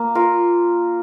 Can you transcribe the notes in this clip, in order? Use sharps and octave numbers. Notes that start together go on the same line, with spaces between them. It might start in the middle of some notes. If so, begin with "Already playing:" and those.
Already playing: A#3
F4 A#4